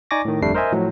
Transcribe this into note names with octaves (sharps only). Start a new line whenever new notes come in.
D#4 D5 G#5 C#6 D6 A#6
A2 D#3
G1 F2 G3 A3 D4 C7
A#4 C5 D#5 E5 G#5
A2 F3 F#3